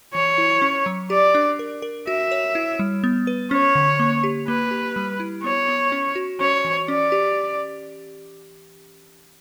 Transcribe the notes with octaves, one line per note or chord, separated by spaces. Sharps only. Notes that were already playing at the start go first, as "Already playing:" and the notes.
E3 C#5
E4
C#4
F#3
G4 D5
D4
A#4
A#4
F#4 E5
C#5
E4
G3
B3
B4
C#4 C#5
D3
A#3
G4
A#3 B4
G4
G3
E4
B3 C#5
B3
C#4
F#4
C#4 C#5
E3
C#4 D5
G4